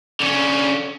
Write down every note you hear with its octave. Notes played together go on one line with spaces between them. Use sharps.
D3 C#4